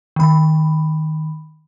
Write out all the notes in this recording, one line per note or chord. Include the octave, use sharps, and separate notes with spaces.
D#3 B5